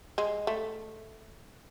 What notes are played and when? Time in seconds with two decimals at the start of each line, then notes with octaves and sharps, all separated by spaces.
0.18 G#3
0.47 A3